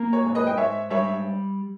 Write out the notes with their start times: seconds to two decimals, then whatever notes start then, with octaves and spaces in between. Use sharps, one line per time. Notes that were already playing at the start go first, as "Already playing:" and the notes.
Already playing: A#3
0.13 C#5
0.24 G#2
0.35 B4 D#5
0.47 G5
0.57 G#2 C#5 E5
0.90 G3 C#5 E5